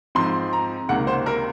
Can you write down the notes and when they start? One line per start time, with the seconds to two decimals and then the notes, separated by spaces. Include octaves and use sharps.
0.15 G#2 F3 C4 C6
0.53 A#5
0.89 C#2 C3 D#3 A#3 F#5
1.07 C5
1.26 A#4